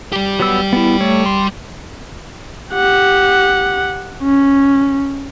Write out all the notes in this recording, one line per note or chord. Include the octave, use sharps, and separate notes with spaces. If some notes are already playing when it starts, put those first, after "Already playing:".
G3 G4
F#3 B3 E6
B3 E4
A3 A4 C#5
C6
G4 F#5
C#4